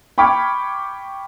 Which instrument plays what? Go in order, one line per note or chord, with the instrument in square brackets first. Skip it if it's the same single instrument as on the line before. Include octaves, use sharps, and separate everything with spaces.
[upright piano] G5 B5 C#6 D6 F6 G#6